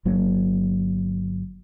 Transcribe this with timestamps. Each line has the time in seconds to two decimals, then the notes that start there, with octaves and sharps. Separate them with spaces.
0.05 G1 F#3 A#3